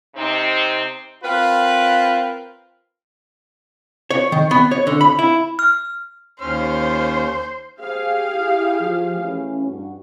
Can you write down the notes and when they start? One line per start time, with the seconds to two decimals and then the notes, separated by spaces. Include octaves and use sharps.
0.15 C3 C4 D#4
1.24 C4 F4 A#4 B4
4.11 C#5
4.32 D#3
4.51 B3
4.71 C#5
4.87 D3
5.01 B5
5.19 E4
5.59 F6
6.41 D#2 C#4 C5 C6 F6
7.80 G4 G#4 C5 F5
8.36 E4
8.81 F3
9.16 E3 A3 C#4
9.67 G2 F#4